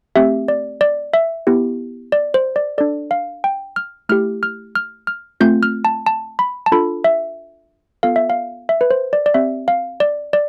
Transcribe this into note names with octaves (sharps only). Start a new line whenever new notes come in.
A3 C4 G4 E5
D5
D5
E5
B3 E4 G4
D5
C5
D5
D4 A4 D5
F5
G5
F6
A3 E4 G4 F6
F6
F6
F6
A3 C4 F4 G6
F6
A5
A5
B5
A5
D4 F4 A4 B5
E5
B3 F4 A4 F5
E5
F5
E5
B4
C5
D5
D5
C4 G4 E5
F5
D5
D5